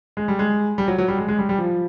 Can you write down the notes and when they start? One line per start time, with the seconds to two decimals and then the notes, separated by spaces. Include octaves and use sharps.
0.17 G#3
0.28 G3
0.39 G#3
0.78 G3
0.88 F#3
0.98 F#3
1.08 G3
1.18 G#3
1.28 G#3
1.38 G3
1.49 G3
1.58 F3